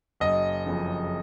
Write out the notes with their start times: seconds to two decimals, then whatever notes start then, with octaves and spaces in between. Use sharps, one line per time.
0.20 F#1 D#5
0.66 F2 C#3